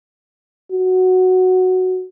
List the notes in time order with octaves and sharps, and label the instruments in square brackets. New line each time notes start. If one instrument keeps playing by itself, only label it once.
[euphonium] F#4